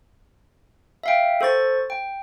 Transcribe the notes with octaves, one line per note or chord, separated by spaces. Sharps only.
E5 F5 G5
A4 C5 C#6 A6
G5